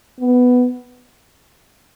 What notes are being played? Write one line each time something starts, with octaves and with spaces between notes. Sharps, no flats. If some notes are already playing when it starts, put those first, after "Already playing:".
B3